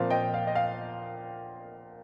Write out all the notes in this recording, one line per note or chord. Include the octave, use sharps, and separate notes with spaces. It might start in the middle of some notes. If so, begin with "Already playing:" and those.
Already playing: A#2 F3 C4 F5
D#5 G5
F5
D#5
F5